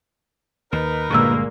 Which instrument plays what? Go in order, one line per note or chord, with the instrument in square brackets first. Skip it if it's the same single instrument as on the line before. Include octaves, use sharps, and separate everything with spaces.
[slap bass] D#2 [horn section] D#4 A#4 B4
[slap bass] G1 G2 D3 [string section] A#2 G#3 A#3 [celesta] C#6 E6